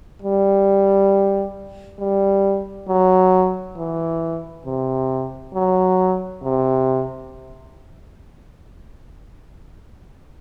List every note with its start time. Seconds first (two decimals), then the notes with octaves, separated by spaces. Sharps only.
0.22 G3
1.99 G3
2.88 F#3
3.77 E3
4.65 C3
5.54 F#3
6.43 C3